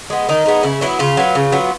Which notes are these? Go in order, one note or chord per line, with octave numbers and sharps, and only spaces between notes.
G#3 B3
D#3 D#4
G#3 B3
C#3 E4
F#3 B3 E4
C#3 F4
F#3 B3
C#3
F#3 B3